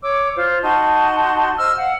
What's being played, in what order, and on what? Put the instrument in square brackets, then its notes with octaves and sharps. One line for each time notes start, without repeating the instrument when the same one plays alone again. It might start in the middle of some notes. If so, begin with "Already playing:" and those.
[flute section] C#5 D6 E6
F4 C5
D#4 F#4 A5 C6
C5 D#5 E6 F6
F5 F#5